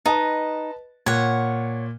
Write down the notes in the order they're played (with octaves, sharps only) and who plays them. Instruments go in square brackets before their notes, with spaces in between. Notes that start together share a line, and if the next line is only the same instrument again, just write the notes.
[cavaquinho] D#4 [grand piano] B4 D#5 A5
[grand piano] A#2 [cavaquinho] C#5 F#5